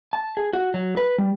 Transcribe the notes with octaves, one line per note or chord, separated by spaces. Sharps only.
A5
G#4
F#4
F#3
B4
G3